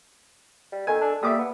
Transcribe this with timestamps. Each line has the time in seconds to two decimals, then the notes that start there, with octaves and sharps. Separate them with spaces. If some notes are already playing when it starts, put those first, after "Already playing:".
0.72 G3
0.87 D#3 A4 G#5
1.01 D4
1.23 G3 A#3 E5 D6 D#6
1.38 B3